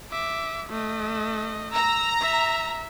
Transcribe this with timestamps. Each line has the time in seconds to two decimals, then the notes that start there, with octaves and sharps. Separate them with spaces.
0.11 E5 D6
0.70 A3 D#5
1.73 A#5 E6
2.21 E5